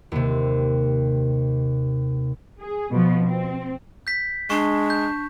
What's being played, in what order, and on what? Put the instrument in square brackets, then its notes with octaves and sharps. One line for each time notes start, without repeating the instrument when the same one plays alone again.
[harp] D#2 C3
[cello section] G#4
B2 F3 B3
C4
[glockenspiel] G6 B6
[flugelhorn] G#3 [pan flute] D4 [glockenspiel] C#6
[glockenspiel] G6